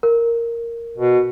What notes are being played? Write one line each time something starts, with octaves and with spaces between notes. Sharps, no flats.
A#4
B2